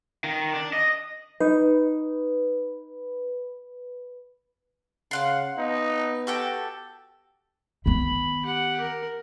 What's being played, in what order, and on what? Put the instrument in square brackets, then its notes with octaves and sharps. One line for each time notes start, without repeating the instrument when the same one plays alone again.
[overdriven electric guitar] D#3
D4
D#5
[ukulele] D#4 [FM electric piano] B4
[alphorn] C#3 [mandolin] F5 F#5 C6
[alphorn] B3 [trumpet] D#4
[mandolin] F#4 A4 G5 [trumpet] G4
[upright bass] D#3 B3 [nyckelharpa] B5
[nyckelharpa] G4 F#5
A#4